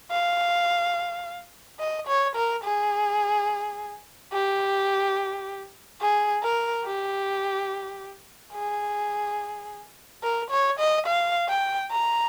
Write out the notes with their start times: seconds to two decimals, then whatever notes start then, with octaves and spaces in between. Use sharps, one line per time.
0.11 F5
1.80 D#5
2.08 C#5
2.36 A#4
2.64 G#4
4.33 G4
6.01 G#4
6.43 A#4
6.86 G4
8.54 G#4
10.23 A#4
10.51 C#5
10.79 D#5
11.07 F5
11.49 G5
11.92 A#5